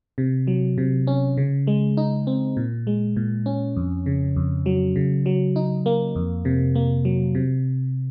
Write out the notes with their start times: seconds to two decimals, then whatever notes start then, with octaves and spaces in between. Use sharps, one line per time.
0.18 C3
0.47 F#3
0.78 C3
1.07 C#4
1.37 C#3
1.67 G#3
1.97 D#4
2.27 C4
2.57 A#2
2.87 G#3
3.16 A#2
3.46 C#4
3.76 F2
4.06 C#3
4.36 F2
4.66 F#3
4.96 C#3
5.26 F#3
5.56 D#4
5.86 A#3
6.16 F2
6.45 C3
6.75 A#3
7.05 F#3
7.35 C3